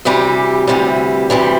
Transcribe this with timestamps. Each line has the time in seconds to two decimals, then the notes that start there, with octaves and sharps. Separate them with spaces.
0.05 D2 C3 E3 G3 G4
0.67 D2 C3 E3 G3
1.30 D2 C3 E3 G3